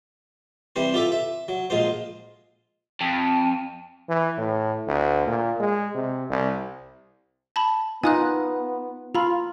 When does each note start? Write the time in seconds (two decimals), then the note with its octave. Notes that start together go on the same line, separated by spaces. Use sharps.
0.76 E3 G3 C4 C5
0.94 F4 G4 A4 E5
1.12 E5
1.48 F#3
1.70 A#1 G#3 F4 C5
3.01 F2
4.09 E3
4.38 A2
4.88 D2
5.27 A#2
5.60 G#3
5.95 C3
6.30 C2
7.56 A5 B5
8.03 B3 D#4 F4 G#5 D#6 F#6
9.15 F4 A#5 B5